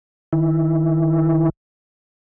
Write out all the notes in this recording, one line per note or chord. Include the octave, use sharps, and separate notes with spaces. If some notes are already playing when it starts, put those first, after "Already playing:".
D#3 E4